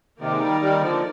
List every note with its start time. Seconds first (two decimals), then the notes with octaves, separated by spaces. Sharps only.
0.20 C3 D#3 A#3 D#4 A#4 D5
0.31 G#3
0.41 D#3 G3
0.61 D#3 G3
0.81 D3 F3